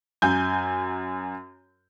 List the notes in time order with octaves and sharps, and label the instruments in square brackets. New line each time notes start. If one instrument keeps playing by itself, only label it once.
[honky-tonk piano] F#2 G#5 G6